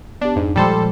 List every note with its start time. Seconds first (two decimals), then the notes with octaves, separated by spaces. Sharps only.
0.21 B3 D4 G4
0.36 F2 G#2 D4
0.56 A#2 F3 G3 G#3 A4 C5